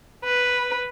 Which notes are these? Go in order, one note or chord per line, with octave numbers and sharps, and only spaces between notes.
B4